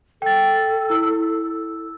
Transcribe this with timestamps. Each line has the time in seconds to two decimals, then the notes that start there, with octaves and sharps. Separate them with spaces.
0.22 A4 G5 A6
0.90 E4 E6